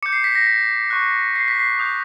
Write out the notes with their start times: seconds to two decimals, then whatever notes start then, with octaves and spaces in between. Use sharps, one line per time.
0.02 D6 G6 C#7
0.13 C7
0.24 B6
0.35 A#6
0.47 B6
0.90 C#6 F#6
1.36 C7
1.48 B6
1.60 C7
1.79 D#6 G6